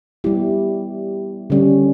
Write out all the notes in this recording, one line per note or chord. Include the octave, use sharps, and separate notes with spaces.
G3 B3 E4 G4
D3 G3 C#4